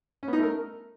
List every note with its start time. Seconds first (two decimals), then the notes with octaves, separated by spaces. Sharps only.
0.23 C#4
0.28 B3
0.33 D#4
0.38 A3
0.43 A#4